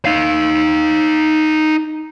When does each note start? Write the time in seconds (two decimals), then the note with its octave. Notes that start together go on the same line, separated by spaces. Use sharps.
0.05 D#4 F5